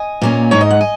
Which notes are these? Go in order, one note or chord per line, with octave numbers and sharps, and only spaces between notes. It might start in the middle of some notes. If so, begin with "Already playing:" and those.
Already playing: D#5 G#5
A#2 A#3 C#4
G#2 G#3 D#4 C#5
D#5
F#5
D#5 G#5